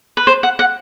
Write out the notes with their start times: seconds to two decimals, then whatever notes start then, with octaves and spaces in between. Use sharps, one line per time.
0.17 B4
0.27 C5
0.43 F#5
0.59 F#5